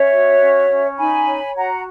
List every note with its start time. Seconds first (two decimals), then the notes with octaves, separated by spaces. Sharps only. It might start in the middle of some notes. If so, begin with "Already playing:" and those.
Already playing: C#4 C#5 E5
0.11 F#4
0.40 C#4
0.69 C#4
0.97 D#4 G#5 B5
1.26 C#5
1.56 F#4 F#5 A#5